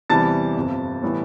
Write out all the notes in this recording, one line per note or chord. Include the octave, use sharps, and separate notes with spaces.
E2 C3 E3 G3 A5 A6
G1 F2 C3
A2 E3 G3 B3